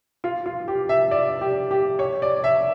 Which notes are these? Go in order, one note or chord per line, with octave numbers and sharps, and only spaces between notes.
F4
F4
G4
E5
D5
G4
G4
C#5
D5
E5